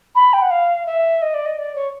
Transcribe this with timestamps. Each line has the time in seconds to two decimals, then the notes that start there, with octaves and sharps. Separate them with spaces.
0.15 B5
0.33 G5
0.42 F#5
0.51 F5
0.86 E5
1.22 D#5
1.34 D5
1.46 D#5
1.58 D5
1.75 C#5